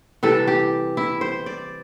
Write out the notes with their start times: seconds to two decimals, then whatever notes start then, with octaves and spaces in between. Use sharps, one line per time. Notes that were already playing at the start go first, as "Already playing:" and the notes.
0.23 C3 E3 G3 A4
0.47 G4
0.97 E4
1.21 C5
1.46 D5